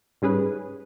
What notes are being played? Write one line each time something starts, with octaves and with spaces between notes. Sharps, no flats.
G#2 G3 C#4 G#4 B4